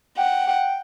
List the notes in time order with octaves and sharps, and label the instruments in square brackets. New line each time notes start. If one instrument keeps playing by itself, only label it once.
[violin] F#5 [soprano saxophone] G5
[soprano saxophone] G5